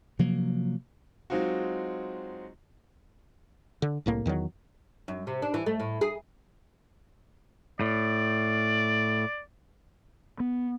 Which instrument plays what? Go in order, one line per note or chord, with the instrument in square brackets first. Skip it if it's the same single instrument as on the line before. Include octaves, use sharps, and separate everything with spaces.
[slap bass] C3 F3 F#3 A#3
[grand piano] F#3 G#3 C4 D#4 F4 F#4
[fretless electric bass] D3
C2 A2 A#3
E2 D#3 E3 F#3
[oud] F#2
C3
D4
E3
A3
A2
G#4
[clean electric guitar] A2 [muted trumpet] D5
[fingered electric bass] B3